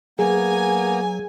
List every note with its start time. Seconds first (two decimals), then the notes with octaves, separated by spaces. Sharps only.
0.19 F#3 A#3 B3 G#4 G#5 A#5